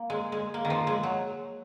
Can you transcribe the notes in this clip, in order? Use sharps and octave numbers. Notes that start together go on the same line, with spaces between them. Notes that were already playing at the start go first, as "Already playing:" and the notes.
Already playing: A#3
G#3
G#3
A#3
D#3
F3
G#3
F#3